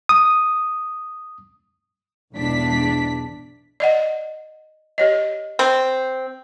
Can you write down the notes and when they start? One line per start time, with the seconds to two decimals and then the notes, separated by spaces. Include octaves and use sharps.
0.09 D#6
2.34 B1 E2 G#2 D4 B6
3.80 D5 D#5 F#5
4.98 G4 C#5 D#5
5.59 C4